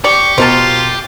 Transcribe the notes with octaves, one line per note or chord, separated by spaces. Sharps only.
G4 D5 C#6
B2 F4 A#4 C5 A5